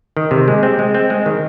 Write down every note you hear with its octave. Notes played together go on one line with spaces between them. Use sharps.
D#3
C3
G#3
C4
G#3
C4
G#3
D#3